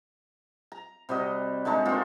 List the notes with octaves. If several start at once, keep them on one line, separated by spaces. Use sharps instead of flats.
A#5
C3 G3 F#4 D#5
D3 G#3 A3 D#4
A#3 C4 F4 F#4